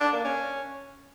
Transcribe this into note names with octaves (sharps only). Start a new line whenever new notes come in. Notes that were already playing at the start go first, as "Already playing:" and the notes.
D4
A#3
C#4